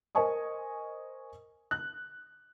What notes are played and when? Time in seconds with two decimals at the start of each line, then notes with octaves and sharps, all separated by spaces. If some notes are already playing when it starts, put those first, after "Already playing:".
0.15 A#4 C5 D#5 G#5 C#6 D#6
1.71 F#6